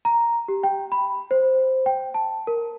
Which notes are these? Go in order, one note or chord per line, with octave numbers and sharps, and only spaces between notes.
A#5
G4
G5
B5
C5
G5
A5
A#4